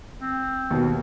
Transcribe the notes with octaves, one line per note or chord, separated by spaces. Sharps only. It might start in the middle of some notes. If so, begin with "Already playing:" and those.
C4
D#2 B2